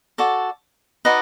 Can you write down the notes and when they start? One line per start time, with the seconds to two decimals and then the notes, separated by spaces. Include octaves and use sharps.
0.18 F#4 A4 D5
1.05 D#4 F#4 B4 D5 D#5